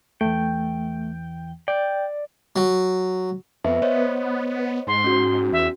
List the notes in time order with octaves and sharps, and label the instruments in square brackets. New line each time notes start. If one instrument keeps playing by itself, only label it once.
[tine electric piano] E2 E3 [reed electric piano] A3 [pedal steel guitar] G5
[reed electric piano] D5 [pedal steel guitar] G5
[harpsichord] F#3
[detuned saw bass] F2 [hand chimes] B3 B4 E5
[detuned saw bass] B3 [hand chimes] C5 C#5 D#5
[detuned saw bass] G#2 [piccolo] C6
[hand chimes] C#4 F#4
[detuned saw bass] E2 [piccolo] E5